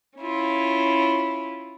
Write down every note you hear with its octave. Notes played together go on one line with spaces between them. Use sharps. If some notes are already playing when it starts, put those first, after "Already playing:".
C#4 E4 F4